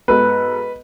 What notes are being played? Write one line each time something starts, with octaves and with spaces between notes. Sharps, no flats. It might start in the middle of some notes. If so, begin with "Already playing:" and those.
G#2 G#3 B3 F#4 A4 B4